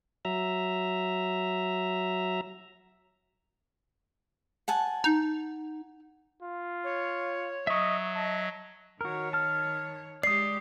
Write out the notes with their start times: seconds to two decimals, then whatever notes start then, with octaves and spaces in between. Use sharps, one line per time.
0.25 F#3 E5 A#5
4.68 F#5 G#5 A5
5.04 D#4
6.43 F4
6.84 C#5
7.67 F#3 D#5 E5 C#6
8.15 D#5 A5
9.01 D#3 F#4 A#4 C#5
9.33 A5 F6
10.23 G#3 G4 D5 D#6 C7